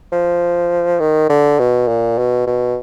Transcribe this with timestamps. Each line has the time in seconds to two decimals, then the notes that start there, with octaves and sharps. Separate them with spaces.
0.12 F3
1.00 D#3
1.29 D3
1.59 B2
1.88 A#2
2.18 B2
2.47 B2